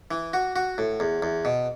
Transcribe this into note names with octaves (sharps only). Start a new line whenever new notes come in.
E3
F#4
F#4
A2
E2
E2
B2